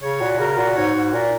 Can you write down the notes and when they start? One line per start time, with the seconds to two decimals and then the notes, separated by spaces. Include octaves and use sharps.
0.02 C#3 C#5
0.21 A#2 F#4
0.39 C#3 A#4
0.57 A#2 F#4
0.76 G#2 C#5
0.94 G#2 F#4
1.13 A#2 A#4